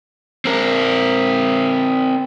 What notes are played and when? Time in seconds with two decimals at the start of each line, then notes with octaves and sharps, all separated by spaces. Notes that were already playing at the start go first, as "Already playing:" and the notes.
0.45 C4 A#4